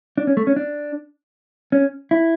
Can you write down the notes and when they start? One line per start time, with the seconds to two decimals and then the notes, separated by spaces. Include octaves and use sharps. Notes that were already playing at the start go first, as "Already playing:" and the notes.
0.18 D4
0.27 C#4
0.37 A3
0.47 C#4
0.56 D4
1.72 C#4
2.11 E4